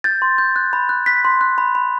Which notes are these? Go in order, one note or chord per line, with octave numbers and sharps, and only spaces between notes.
G6 A6
C6
G6
F#6
B5
F#6
F#6 B6
C6
F#6
B5
B5